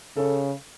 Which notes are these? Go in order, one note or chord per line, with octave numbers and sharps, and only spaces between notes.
C#3 A4